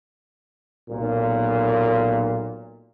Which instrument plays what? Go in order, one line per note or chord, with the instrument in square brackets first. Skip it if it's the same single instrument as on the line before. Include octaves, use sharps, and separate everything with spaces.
[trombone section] B1 A#2